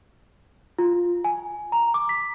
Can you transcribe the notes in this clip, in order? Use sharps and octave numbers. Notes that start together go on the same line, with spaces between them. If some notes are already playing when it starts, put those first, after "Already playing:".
F4
G#5
A#5
D6
B6